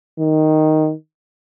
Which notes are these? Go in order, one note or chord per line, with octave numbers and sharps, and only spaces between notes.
D#3